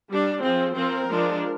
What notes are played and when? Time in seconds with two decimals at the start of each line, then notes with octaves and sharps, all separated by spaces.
0.08 G3 D4
0.42 F3 C4 G#4
0.75 F3 C4 A#4
1.09 F3 G#3 D4